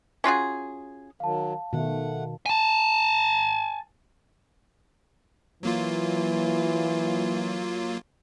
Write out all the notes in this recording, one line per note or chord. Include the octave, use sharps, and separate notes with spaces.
C#4 F4 F#4 G#4
D#3 F#3 F5 A5
B2 D#3 A3 F#5
G#5 A5
E3 F#3 A#3 F4